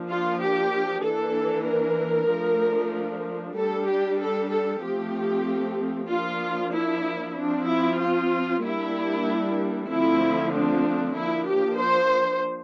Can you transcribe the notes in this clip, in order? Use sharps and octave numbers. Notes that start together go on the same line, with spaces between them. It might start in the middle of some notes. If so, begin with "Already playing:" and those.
Already playing: F3 A#3 D4
F4
G4
E3 A#3 D4 A4
A#4
F3 A3 D4
G3 D4 A4
G4
A4
A4
F3 A3 C4 G4
F3 A#3 D4 F4
E4
F3 C4 D4
E4
F4
G3 A#3 D4 E4
D3 F3 A3 C4 E4
D4
F3 A#3 D4 E4
G4
C5